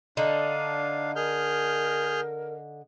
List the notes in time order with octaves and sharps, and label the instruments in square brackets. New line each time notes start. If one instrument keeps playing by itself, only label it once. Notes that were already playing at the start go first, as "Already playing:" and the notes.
[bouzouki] D3 D#4 [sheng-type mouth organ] D4 F5
[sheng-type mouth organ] G#4 F6 G6 [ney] A#4